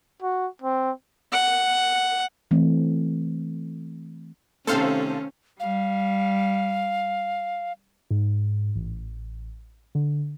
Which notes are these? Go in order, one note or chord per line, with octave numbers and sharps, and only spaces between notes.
F#4
C4
F#5
E3 A3 C4
C3 D#3 A3 C#4 A4 C5 F5
G3 F5
G#2
A1
D3